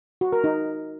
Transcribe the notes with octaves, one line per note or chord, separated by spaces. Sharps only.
F#4
A#4
D#4